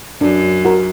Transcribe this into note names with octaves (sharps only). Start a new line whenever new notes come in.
F#2 D4
F#4 A#4